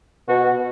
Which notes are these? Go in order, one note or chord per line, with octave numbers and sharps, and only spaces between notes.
B2 F#4